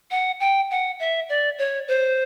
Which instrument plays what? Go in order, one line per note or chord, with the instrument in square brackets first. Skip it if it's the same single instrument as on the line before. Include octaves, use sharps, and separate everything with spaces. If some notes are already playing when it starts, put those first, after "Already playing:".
[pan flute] F#5
G5
F#5
E5
D5
C#5
C5